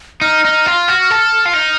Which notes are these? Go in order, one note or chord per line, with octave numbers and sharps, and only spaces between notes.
D#4 F6
D#4
F4
F#4
A4
F4
D#4